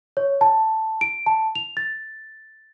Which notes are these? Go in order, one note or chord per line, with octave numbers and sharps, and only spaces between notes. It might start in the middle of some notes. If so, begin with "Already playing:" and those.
C#5
A5
D7
A5
F7
A6